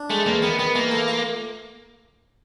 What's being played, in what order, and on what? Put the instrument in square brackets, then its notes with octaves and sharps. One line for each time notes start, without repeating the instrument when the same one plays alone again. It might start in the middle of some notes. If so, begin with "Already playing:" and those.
Already playing: [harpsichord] D4
[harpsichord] G#3 [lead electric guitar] A3
[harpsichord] E2 [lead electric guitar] A#3
[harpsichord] D#3 [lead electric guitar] B3
[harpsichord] D#3 [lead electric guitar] B3
[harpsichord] E3 [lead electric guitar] A#3
[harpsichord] A3
F4